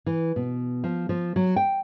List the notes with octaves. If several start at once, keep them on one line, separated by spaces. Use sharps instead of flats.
E3
B2
F3
F3
F#3
G5